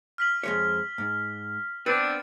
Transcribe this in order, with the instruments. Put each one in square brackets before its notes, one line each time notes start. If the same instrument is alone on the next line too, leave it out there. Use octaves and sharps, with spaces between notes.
[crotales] F6 B6 F#7
[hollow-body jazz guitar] F2 G#3 C#5
G#2
[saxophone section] B3 C4 D4 [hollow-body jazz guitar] B4 [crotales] A6 C#7